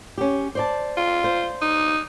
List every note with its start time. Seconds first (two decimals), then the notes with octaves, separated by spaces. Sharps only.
0.18 C#4 G4
0.55 C5 D5 A5
0.97 F4
1.24 C5
1.62 D#4